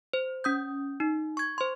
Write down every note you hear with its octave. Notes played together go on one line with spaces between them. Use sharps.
C5
C#4 D#6 G6
D#4
C#6 G#6
C5 C6